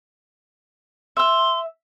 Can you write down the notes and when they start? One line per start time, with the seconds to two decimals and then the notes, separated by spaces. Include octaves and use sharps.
1.17 E5 C6 E6